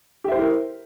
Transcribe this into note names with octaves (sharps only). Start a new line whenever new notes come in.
E4 G4 A#4 C5 E5